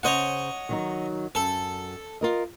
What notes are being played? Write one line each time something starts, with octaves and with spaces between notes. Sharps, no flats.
C#3 C5 C#5 D#5 F#5
D#3 F#3 D#4
F#2 A4
F4 A#4 D#5